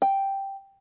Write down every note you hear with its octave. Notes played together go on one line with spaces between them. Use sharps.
G5